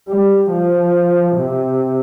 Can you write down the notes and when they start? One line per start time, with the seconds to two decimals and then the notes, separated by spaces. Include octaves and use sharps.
0.08 G3
0.51 F3
1.36 C3